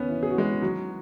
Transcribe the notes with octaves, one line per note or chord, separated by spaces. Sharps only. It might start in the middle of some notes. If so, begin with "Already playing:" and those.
Already playing: D#2 C#3 B3 C#4 B4
E3
G#4
F#4
E3 G#3 G#4
D#3 F#3 F#4